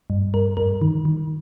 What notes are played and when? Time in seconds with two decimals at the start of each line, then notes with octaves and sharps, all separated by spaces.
0.10 G2
0.34 G2 A#4
0.57 G2 A#4
0.82 D#3
1.05 D#3